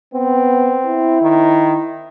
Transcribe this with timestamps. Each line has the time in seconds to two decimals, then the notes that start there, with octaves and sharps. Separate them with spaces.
0.14 B3 C4
0.86 E4
1.22 D#3